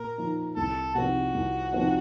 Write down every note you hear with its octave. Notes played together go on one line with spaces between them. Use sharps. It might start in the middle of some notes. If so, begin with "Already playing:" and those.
Already playing: A#2 A#4
F3 A#3 D#4
C2 A4
C3 F3 C4 D#4 F#4
C2
C3 F3 C4 D#4